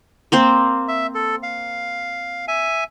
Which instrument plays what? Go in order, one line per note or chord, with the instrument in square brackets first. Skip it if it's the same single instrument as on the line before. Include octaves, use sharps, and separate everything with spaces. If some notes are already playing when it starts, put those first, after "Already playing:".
[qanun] A#3 C4 C5
[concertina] E5
A4
F5
E5 G#5